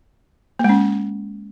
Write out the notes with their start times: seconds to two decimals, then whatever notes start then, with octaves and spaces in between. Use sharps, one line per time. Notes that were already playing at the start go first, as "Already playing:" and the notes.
0.59 A#3
0.64 G#3
0.69 C#4